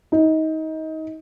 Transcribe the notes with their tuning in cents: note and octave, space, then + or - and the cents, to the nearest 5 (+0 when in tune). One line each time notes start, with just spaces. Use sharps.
D#4 +25